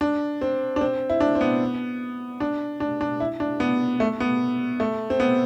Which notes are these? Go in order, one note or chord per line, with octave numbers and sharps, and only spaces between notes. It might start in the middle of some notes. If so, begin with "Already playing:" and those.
D4
C4
D4
C4
E4
D4
C4
B3
D4
D4
D4
E4
D4
B3
A3
B3
A3
C4
B3